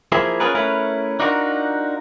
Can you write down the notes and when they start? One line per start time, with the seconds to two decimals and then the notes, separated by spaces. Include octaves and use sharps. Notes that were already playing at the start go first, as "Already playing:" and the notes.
0.12 F3 A#3 E4 G#4 A#4
0.40 C#4 F4 G#4 A#4 B4
0.55 A3 C#4 E4 A#4 B4
1.20 D4 D#4 F4 F#4 A#4